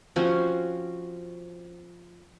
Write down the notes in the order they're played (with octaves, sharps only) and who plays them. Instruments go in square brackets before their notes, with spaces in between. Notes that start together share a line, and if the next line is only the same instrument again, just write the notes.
[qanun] F3 C4 C#4 F#4